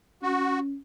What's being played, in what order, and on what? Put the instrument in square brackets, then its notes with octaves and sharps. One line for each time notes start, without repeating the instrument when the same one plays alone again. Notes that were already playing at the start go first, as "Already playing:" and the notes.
[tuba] C#4 [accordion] F#4